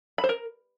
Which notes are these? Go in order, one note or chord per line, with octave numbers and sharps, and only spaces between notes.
B5
C5
A#4